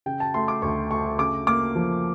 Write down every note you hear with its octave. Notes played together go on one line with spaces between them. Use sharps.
C#3 G5
A5
A3 C6
D6
D2 C#6
A3 C#6
C#3 D6
A#3 D6
F3